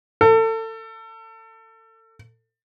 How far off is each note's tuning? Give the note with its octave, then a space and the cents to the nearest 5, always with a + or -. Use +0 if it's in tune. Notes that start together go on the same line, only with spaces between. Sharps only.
A4 +30